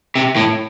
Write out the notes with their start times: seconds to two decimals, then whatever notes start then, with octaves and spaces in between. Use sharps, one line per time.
0.15 C3
0.36 A2